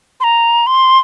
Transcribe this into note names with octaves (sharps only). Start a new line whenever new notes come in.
C6
A#5
C6